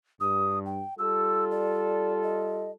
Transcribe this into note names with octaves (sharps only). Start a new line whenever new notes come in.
G2 D#6
G5
G3 F4 A4 E6
D5
D#5